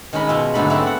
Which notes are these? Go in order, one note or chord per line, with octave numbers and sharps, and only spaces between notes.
D#3 G#3 C#4 A#4 B5
B2 F4 E5 G#5
G#2 D3 F#3 A3 D#4 B5
G3 A3 B3 C4 E4 G#4
F#5 B5